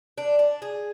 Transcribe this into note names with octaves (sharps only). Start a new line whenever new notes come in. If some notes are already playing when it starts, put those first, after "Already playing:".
D4
D4
G#4